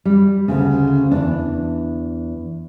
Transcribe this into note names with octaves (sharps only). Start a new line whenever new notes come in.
G3
D2 C#3
E2 D4